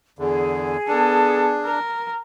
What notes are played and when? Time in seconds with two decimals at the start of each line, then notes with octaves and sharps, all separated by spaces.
0.19 E2 D3 G#4
0.88 B3 D4 A4
1.65 A#4